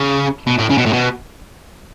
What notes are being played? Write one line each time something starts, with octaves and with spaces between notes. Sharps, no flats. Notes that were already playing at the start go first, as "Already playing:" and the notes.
Already playing: C#3
B2
A2
C#3
B2
A2
B2